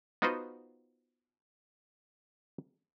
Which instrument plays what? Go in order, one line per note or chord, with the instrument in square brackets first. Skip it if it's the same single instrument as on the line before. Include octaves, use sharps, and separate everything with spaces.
[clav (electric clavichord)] B3 D#4 F4 F#4 B4 C5